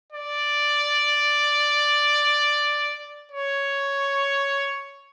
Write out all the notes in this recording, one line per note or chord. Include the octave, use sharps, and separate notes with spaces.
D5
C#5